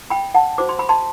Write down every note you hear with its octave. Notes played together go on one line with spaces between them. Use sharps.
G5 B5
F#5 A5
F#4 C5 D6
C6
B5
A5 C6